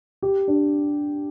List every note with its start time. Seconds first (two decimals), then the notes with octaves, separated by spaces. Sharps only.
0.22 G4
0.48 D4